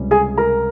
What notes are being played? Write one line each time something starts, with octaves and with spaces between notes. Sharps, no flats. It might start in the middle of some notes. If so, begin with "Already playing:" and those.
Already playing: C#2 C3 G3 C#4
G#4 G#5
A#4 A#5